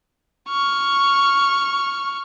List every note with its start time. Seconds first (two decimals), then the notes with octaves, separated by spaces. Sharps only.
0.49 C#6 F6